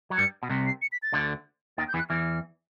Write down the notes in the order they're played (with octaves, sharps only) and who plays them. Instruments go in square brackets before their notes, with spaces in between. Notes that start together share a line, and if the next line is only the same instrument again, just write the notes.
[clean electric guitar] F#3
[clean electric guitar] G2 G3 [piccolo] C#7
[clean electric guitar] B2
C2 C3
[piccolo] C7
C#7
B6
A6
[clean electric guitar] D2 D3
[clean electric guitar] D#2 D#3 [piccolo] A6
[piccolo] G6
[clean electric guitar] E2 E3
[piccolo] F#6
[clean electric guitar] E2 E3 [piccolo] F6